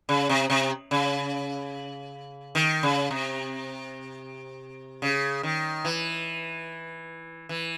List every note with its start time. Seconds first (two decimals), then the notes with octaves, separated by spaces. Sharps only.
0.09 C#3
0.29 C3
0.50 C3
0.91 C#3
2.55 D#3
2.83 C#3
3.11 C3
5.02 C#3
5.43 D#3
5.85 E3
7.49 E3